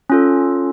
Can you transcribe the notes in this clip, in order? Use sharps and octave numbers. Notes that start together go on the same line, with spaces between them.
C#4 F4 A4